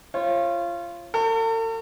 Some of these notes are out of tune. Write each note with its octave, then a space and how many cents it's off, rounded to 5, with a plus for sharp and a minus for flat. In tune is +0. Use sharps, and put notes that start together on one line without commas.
F4 -25 C#5 -40
F#4 +0 A4 +45